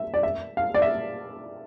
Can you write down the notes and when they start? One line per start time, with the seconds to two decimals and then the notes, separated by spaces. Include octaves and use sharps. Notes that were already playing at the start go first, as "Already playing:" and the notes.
Already playing: E5
0.14 D5
0.23 E5
0.57 F5
0.74 D5
0.82 E5